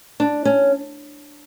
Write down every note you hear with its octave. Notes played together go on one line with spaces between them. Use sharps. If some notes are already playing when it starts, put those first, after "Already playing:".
D4
C#4